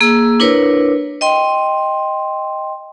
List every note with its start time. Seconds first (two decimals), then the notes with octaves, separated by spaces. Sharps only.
0.01 A#3 G#4 E6
0.40 D4 E4 A#4 B4 C#5
1.21 D#5 G5 C6